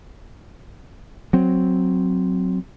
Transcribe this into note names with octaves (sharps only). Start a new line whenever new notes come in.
F#3 C4